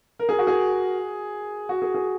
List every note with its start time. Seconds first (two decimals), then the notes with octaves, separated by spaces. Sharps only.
0.19 A#4
0.29 G#4
0.39 F#4
0.47 G#4
1.69 F#4
1.82 G#4
1.94 G#4